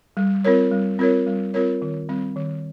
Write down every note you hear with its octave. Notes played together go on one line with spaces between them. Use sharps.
G3
C4 F4 A#4 C#5
G3
C4 F4 A#4 C#5
G3
C4 F4 A#4 C#5
D#3
G3 C4
D#3